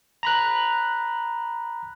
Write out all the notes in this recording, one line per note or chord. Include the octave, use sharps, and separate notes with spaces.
A#5 B5 F#6